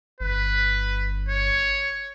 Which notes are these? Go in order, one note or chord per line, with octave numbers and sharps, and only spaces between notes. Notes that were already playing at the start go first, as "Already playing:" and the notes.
G1 B4
C#5